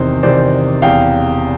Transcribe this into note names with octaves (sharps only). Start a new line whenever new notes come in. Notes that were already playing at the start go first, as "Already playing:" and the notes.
Already playing: E2 C3 D#3 C5
E2 C3 D#3 C5 D5
E1 E2 C3 F5 G5